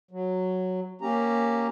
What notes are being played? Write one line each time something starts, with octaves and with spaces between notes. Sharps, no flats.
F#3
A#3 C#4 G4 A#5